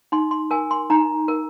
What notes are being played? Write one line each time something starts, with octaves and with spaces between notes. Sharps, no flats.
D#4 C6
C6
A#4 G#5
C6
D#4 A#5
A#4